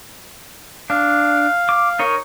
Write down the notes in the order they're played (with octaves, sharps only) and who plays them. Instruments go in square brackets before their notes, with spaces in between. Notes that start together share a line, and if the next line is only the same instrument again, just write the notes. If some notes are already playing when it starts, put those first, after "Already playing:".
[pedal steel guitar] D4 [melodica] F5
[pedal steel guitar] D6
D#4 A#4 C#5